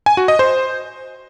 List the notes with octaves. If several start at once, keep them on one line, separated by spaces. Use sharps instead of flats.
G#5
F#4
D#5
C5